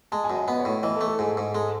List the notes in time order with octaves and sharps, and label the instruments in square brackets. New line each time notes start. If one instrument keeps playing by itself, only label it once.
[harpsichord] G#3 [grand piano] A5
[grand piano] G#5
[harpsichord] F#2
[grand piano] D#5
[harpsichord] B3 [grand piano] B4
[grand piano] C#5
[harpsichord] A2
[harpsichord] E3 [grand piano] D#5
[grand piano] A4
[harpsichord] A3
[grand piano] A4
[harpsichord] G#2 [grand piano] G#4
[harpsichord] G#2
[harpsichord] G#3 [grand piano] A4